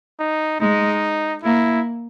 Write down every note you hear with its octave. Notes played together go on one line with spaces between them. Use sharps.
D#4
G#3 D#4
A#3 E4